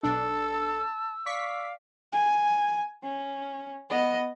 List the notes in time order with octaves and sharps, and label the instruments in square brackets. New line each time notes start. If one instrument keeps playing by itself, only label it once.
[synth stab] B1 D4 [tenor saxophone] A4 [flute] A5 [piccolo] E6
[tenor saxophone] D5 [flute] F5 [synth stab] C#6 B6
[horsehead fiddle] G#5
C#4
B3 D#5